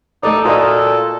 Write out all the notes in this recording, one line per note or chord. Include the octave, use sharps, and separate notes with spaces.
A3 D#4 A4 D5
A#2 F#4 A4 A#4 D#5